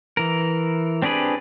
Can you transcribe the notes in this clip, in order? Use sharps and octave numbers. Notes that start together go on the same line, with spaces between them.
E3 A#4
C4 D4 G4 G#4 B4